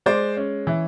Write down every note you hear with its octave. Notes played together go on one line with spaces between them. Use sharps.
G#3 C5 D5
C#4
E3